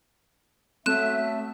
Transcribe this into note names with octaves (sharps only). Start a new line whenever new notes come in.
F#3 A3 B3 C4 E5 F#6 E7